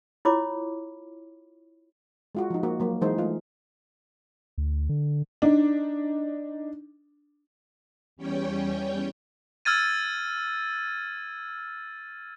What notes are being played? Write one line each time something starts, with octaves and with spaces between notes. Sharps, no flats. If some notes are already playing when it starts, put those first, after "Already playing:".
E4 F4 C#5 B5 D6
G#3 F4 F#4
F3 D#4
A#3 F#4
F#3 A#3
E3 G#3 D#4 C5
A3 F4
D2
D3
D4 D#4
E2 G3 C#4 C#5 G5
E6 F6 G#6 A6 D#7